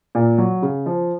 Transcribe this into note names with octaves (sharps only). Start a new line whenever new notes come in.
A#2
F#3
C#3
F3